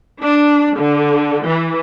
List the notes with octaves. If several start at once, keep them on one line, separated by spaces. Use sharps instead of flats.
D4
D3
E3